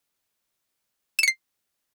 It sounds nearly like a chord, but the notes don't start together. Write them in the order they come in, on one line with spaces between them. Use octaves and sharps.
E7 C#7 C7